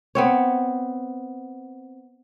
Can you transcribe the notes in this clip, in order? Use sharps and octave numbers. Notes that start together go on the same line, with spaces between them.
B3 C4 C#5